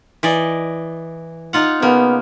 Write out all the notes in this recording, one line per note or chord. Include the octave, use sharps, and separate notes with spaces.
E3 D5 D#5
D#4 F4 F#5
C#3 A#3 B3